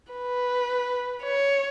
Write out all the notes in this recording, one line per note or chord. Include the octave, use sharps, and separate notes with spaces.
B4
C#5